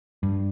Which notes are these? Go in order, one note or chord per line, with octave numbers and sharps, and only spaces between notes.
G2